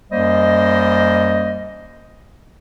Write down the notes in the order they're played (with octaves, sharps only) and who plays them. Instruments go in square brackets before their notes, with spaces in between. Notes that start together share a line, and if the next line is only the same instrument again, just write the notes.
[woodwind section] F#2 G3 A#3 C5 D#5